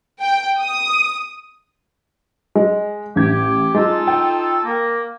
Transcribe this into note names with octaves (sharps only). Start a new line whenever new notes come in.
G5
D#6
G#3
A1 G4 G#6
G#3 D#4 F4 A4
G5
A#3